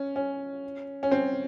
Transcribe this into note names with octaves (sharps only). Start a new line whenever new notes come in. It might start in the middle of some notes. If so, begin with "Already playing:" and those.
Already playing: C#4
C#4
C#4
C4